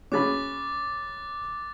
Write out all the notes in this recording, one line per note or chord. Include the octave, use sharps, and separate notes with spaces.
C#4 G#4 B5 D6 F#6 A6